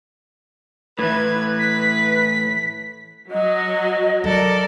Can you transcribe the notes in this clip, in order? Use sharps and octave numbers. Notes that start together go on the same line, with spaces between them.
A2 E3 B4 G#6
B6
F#3 D#5
F#3 A4 A#4 D5